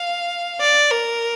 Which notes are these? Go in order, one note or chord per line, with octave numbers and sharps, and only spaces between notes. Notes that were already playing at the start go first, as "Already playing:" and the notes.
Already playing: F5
D5
A#4